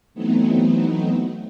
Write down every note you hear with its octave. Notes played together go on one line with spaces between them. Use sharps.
E3 F#3 A3 B3 C4 D#4